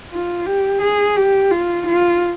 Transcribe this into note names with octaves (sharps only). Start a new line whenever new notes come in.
F4
G4
G#4
G4
F4
F4